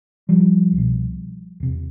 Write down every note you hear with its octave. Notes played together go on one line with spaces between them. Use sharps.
F3 G3
C2
B2
E2 C3